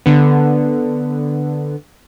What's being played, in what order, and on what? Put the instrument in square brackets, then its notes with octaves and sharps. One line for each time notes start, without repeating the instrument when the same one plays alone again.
[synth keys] D3 B3